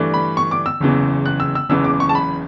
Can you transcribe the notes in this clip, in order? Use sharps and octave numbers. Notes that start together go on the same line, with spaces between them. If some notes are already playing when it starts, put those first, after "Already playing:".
Already playing: G2 E3 A3 D4
B5
C#6
D6
E6
F#1 E2 C#3 E3
F#6
E6
E6
F#1 E2 C#3 E3 B3 E6
D6
C#6
A5
B5